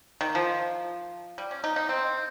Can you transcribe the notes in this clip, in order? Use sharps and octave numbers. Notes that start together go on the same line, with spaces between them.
D#3
F3
G3
C#4
D#4
D#4
C4